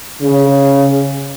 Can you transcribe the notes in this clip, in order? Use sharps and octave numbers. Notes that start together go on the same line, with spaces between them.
C#3